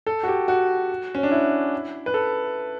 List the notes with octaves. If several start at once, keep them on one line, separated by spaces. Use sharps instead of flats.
A4
F#4
G4
F#4
C#4
D4
E4
B4
A4